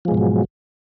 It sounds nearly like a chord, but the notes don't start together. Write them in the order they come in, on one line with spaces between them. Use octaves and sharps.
F3 G#3 B2 G#2 F#3